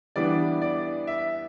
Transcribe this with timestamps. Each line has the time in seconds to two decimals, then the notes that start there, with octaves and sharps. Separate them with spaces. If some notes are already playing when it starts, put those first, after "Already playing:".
0.16 E3 G3 B3 D4 D5
0.62 D5
1.07 E5